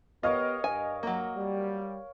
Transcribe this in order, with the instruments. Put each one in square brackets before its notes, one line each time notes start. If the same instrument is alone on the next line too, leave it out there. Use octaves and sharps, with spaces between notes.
[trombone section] B3 G4 [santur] A#4 C#5 F5 [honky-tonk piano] D#5
[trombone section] G2 [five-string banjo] G#5
[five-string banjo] F#3 A#3
[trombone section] G3